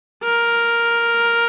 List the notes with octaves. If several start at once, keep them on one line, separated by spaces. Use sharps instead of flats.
A#4